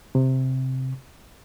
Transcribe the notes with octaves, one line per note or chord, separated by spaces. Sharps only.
C3